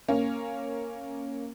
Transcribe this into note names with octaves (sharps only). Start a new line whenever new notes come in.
A#3 C#4